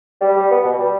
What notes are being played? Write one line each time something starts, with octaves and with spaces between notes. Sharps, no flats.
G3
G3
B3
B2
G3